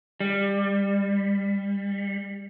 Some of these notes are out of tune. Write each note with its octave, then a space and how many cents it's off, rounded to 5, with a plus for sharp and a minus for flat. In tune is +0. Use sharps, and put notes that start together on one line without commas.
G3 +25